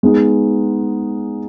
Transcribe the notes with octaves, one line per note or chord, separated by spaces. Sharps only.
G#3 B3 D#4